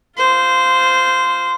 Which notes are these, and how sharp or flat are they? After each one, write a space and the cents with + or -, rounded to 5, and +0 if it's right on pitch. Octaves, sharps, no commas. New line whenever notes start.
F4 +0 C5 -15